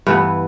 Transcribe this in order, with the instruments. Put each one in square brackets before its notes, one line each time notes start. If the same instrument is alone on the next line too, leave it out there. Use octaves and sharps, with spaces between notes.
[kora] G2 E3 B3